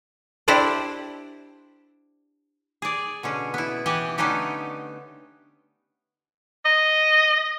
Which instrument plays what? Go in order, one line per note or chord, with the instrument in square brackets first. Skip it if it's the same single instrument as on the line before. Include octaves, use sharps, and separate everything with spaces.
[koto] D4 E4 G4 C5 D5
G#4 D5
B2 D3 C#4
B3 E4
E3 G4 F#5 G#5
D3 A3 B3 C#4 D#4 G4
[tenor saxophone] D#5